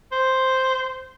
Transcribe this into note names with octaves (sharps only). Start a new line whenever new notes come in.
C5